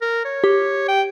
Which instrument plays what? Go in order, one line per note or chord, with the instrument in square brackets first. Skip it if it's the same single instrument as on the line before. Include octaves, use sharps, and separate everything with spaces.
[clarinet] A#4
C#5
[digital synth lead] G4
[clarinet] G5